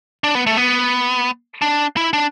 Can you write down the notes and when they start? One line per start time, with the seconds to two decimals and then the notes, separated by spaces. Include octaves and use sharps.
0.24 D4
0.35 B3
0.47 A3
0.57 B3
1.62 D4
1.97 E4
2.13 D4